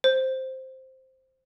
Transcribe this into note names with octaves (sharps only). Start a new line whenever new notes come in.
C5